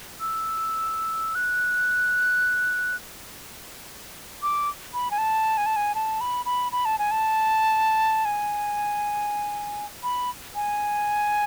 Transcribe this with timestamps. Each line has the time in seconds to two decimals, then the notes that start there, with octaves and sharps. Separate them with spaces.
0.20 E6
1.35 F#6
4.43 D6
4.94 B5
5.11 G#5
5.18 A5
5.57 G#5
5.66 A5
5.76 G#5
5.95 A5
6.21 B5
6.46 B5
6.72 B5
6.85 A5
6.99 G#5
7.11 A5
8.25 G#5
10.03 B5
10.55 G#5